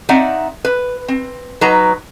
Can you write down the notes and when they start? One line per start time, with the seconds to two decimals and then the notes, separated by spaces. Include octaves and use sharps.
0.09 C4 D#4 D5 E5 F#5
0.65 B4
1.08 C4
1.61 F#3 D#4 B4 A#5